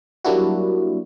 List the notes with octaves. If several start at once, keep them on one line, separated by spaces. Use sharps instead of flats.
F#3 G3 A#3 D4 E4 F#4